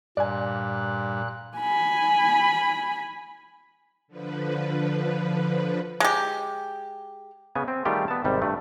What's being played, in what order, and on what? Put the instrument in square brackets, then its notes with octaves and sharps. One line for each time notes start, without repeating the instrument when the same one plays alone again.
[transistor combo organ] G2 [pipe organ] A#2 F#6 [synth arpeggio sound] D5 G#5
[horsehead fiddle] G#5 B5
[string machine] D3 F3 B4
[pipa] G#3 G4
[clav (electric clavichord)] C#3 B3 G#5
C4
D#3 G3 A3 F4 G4 G#4
B3 A5
G#1 C3 G3
G2 A3